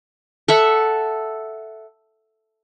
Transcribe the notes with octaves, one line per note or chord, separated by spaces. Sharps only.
A4 E5 F#5